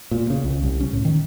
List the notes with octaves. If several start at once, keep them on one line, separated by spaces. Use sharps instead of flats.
A#2
C#3
C#2
C2
C#4
A2
D#3